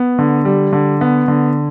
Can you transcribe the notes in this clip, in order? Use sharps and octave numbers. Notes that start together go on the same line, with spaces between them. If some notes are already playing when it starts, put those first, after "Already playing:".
Already playing: B3
D3
G3
D3
B3
D3